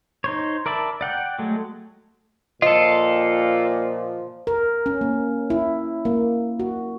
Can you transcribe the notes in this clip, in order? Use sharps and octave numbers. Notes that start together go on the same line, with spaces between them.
D#4 C5 C#5
A#4 D5 E5 A5 B5
D5 F#5 G5
F#3 G#3 A3
A#2 F3 F4 A4 D#5
A#4
C#4
A#3
E4
A#3
F#4